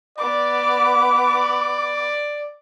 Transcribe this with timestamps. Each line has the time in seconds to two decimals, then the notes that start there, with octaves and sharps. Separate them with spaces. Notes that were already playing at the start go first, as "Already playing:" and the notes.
0.18 B3 D5 D6
1.14 D5